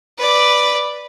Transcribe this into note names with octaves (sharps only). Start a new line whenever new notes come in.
B4 D5